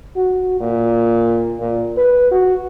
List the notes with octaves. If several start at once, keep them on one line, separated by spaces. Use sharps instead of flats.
F#4
A#2
A#2
B4
F#4